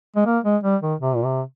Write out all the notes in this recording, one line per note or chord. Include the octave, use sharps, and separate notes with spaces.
G#3
A#3
G#3
G3
D#3
C3
A#2
C3